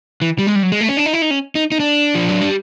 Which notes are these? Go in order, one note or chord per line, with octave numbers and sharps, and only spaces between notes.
E3
G3
G#3
G3
F#3
G#3
A3
C#4
D4
D#4
E4
D#4
C#4
D#4
D#4
D4
F3
F#3
G3